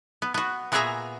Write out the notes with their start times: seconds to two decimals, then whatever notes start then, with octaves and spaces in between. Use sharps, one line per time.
0.22 B3
0.34 B3 F#4
0.72 A#2 B3 F#4 G#4 E5 A#5